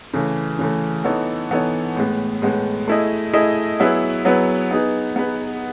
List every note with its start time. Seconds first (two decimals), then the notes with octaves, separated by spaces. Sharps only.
0.14 C#3 E3 A3
0.59 C#3 E3 A3
1.05 E3 B3 D#4 A4 C#5
1.51 E3 B3 D#4 A4 C#5
1.96 A2 G#3 B3
2.42 A2 G#3 B3
2.88 A3 E4 G#4 D#5
3.33 A3 E4 G#4 D#5
3.80 F#3 B3 E4 G#4 B4
4.25 F#3 B3 E4 G#4 B4
4.71 B3 D#4 G#4 B4
5.16 B3 D#4 G#4 B4